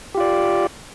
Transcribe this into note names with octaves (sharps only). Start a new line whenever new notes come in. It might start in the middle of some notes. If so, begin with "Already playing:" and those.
F4 G4 D5